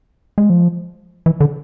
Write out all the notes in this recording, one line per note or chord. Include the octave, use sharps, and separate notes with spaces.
G#3
F3
E3
D3